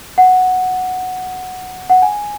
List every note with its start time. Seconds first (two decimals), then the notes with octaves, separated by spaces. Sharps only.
0.18 F#5
1.90 F#5
2.02 G#5